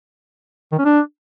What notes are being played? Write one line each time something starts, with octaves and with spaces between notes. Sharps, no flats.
D#3
C#4
D4